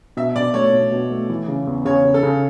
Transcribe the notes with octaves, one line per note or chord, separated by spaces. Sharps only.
B2 E5
B2 D5
A3 C#5
B2
B2
A3
E3
C#3
E2
C#3 C#5
C#3
A4
C#3